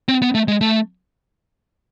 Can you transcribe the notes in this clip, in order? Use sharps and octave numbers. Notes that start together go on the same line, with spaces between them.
C4
B3
A3
G#3
A3